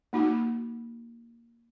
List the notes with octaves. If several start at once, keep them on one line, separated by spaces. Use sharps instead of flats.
A#3 D#4 F#4